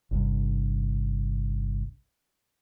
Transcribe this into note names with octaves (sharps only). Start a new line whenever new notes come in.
G1 C2 G2